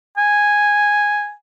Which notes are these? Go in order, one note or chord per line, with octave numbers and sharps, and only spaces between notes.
G#5